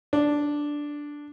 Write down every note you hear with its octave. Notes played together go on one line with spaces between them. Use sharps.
D4